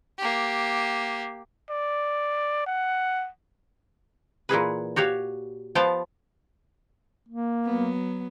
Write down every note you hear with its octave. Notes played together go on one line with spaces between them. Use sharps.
A#3 G4
D5
F#5
A#2 E3 G#4 B4
F#4 G4 C#5 F5
F3 B3 F5 G5 A5
A#3
F#3 B3